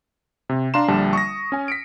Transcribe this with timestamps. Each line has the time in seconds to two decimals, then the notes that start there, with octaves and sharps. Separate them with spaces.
0.49 C3
0.74 D4 F5 A#5 C6 E7
0.88 A#1 D3 G3 A5
1.13 C#6 D#6 A#6
1.52 C#4 G#5
1.68 B6 C#7 D7